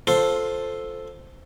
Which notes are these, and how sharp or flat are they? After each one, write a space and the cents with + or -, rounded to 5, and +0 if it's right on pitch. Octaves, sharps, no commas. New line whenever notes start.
F4 +15 A4 +0 C5 +0